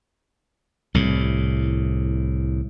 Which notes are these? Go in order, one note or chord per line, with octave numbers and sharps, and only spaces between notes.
C2 A2